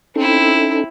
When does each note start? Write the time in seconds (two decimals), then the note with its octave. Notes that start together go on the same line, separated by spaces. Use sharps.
0.16 C4 C#4 D#4 E4 A4